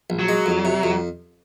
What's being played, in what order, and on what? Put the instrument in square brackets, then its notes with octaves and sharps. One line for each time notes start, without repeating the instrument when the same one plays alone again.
[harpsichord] A#1
[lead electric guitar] F#3
[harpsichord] G#3
F2
C3
F2